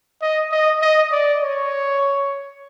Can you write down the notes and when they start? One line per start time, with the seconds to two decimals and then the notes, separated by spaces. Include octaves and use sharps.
0.22 D#5
0.52 D#5
0.82 D#5
1.11 D5
1.41 C#5